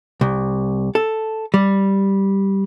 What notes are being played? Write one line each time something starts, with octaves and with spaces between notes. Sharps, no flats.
C2
A4
G3